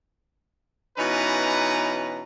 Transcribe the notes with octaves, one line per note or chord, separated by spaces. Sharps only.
B2 E3 C#4 D#4 B4 A#5